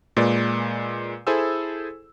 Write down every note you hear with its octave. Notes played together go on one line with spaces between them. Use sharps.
A#2 G#3 B4 D5 A6
E4 G#4 A4 C5 G#5 E6